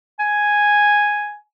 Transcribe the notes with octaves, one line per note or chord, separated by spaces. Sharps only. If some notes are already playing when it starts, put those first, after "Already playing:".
G#5